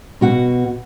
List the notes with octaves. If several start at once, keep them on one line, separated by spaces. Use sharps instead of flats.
B2 F#4 F#5